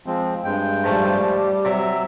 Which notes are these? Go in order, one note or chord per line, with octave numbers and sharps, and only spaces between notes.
F3 G#3 C4
G2 G#3 G5
G#2 F3 G3 A3
C3 F#3 E5